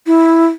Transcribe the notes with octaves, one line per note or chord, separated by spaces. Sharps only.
E4